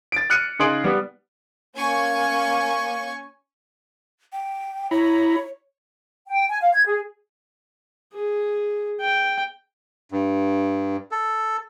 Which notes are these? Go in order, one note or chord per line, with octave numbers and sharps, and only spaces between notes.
A6 D7
F6 F#6 C#7 D#7
C#3 D#4 G#4 C6 D7 F#7
G3 B3
A#3 C#4 G#5 C#6
G5
E4 C#5 A#5 B5
G5
G#5
F5
G#6
G#4
G#4
G5
G2
A4